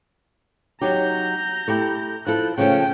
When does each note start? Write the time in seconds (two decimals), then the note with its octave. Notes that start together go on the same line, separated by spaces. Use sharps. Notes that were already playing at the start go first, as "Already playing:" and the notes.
0.81 F#3 D#4 G4 A#5 G6
1.68 A3 E4 G4
2.27 F3 E4 A4 F#6
2.58 C#3 F3 A3 C#4 G5